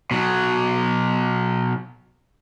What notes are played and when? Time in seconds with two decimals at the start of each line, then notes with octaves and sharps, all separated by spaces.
0.11 B2 F#3